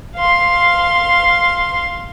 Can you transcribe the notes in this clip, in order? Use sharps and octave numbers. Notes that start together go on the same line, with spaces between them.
F5 C6